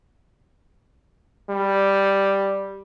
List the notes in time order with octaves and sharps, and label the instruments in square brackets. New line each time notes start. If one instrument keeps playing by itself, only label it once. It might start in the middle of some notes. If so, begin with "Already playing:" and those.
[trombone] G3